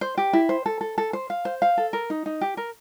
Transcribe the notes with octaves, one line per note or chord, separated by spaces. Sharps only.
C5
G4
E4
C5
A4
A4
A4
C5
F5
C5
F5
A4
A#4
D#4
D#4
G4
A#4